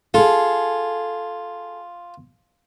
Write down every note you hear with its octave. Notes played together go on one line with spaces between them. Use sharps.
F4 G#4 A4